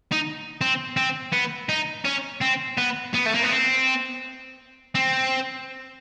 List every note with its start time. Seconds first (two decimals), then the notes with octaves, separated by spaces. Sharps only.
0.12 D#4
0.61 C4
0.97 C4
1.33 B3
1.69 D#4
2.05 C#4
2.42 C4
2.78 B3
3.14 B3
3.26 A3
3.34 A#3
3.42 B3
3.49 C4
4.95 C4